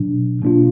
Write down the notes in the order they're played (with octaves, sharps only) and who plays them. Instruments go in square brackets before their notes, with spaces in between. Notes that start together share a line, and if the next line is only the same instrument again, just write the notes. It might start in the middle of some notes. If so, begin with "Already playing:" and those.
Already playing: [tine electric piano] B2 F#3 D4
B2 A#3 D4 F4